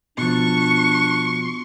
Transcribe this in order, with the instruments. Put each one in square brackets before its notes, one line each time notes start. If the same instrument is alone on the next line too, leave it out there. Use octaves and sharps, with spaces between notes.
[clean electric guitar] B2 F3 [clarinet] D4 [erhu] C#6